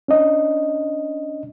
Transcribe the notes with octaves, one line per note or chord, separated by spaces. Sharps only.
C#4 D4 D#5